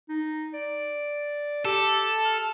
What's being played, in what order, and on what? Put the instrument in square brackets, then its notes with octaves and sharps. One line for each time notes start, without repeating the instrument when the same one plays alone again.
[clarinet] D#4
D5
[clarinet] G4 [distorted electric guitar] A4
[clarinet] F6